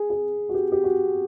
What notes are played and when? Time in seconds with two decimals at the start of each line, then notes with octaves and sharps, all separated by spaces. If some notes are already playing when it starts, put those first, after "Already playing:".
Already playing: G#4
0.10 G#4
0.49 F#4
0.54 G4
0.72 G4
0.84 F#4